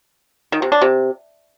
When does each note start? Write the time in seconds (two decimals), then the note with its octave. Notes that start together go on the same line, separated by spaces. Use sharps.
0.52 D#3
0.62 C3
0.72 D4
0.82 C3